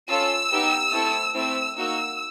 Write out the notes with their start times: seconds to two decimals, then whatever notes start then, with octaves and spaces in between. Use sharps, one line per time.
0.09 C#4 F4 A4 E6
0.52 B3 D#4 G4
0.93 A3 C4 E4 A4
1.35 A3 C4 E4 E6
1.78 A#3 D#4 F#4 E6